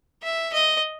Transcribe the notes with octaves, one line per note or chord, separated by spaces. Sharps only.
E5
D#5